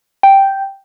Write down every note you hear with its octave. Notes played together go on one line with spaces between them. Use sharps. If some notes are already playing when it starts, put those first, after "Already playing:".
G5